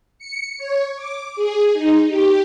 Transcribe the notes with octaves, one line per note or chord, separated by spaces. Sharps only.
C#7
C#5
D6
G#4
D#4
G4